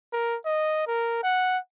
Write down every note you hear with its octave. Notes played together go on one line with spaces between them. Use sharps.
A#4
D#5
A#4
F#5